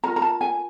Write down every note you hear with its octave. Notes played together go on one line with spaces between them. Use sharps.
F4 A#4 A#5
A#5
A5
G#5